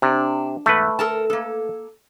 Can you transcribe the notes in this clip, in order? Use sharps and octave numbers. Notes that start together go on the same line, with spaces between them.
C3 D4
E2 G#2 A3 B4
A4 A#4 A5
A#3 A4